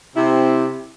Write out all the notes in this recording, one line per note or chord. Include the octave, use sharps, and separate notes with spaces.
C3 C4 E4